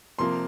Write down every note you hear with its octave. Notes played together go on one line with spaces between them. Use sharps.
C3 F3 A#3 C6